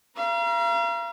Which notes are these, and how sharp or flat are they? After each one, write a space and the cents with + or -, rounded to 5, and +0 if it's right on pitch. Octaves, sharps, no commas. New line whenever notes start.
F5 -40 A#5 +35